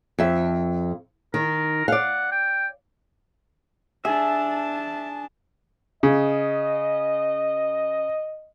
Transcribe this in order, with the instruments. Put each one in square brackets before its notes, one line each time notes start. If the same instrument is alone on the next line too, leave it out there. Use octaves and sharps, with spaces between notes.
[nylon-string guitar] F2 E5
[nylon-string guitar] D#3 [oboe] A#4
[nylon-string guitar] D5 F5 [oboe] F#5
[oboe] G5
[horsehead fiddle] D4 A5 [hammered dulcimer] G#4 [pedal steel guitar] E5
[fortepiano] C#3 [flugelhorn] D#5